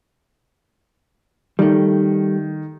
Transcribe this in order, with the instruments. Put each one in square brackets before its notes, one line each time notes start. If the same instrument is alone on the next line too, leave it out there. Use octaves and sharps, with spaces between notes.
[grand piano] D#3 [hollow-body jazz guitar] G3 A3